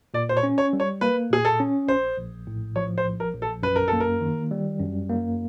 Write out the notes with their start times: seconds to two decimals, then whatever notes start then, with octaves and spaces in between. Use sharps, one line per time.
0.14 A#2 D5
0.29 C5
0.37 C#5
0.43 C#4
0.58 C#5
0.73 G3
0.80 C#5
1.01 A#3 B4
1.30 A#2 G#4
1.45 A4
1.60 C#4
1.88 A#1 C5
2.17 A#1
2.47 A2
2.76 F3 C#5
2.98 C5
3.05 A#1
3.20 A#4
3.35 A#1
3.42 A4
3.63 F#2 B4
3.76 A#4
3.88 A4
3.93 A#3
4.00 A#4
4.21 D#3
4.51 G3
4.80 F#2
5.09 A#3